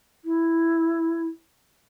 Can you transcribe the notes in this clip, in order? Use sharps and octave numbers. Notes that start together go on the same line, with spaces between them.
E4